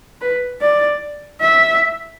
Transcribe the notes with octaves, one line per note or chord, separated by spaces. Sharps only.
B4
D5
E5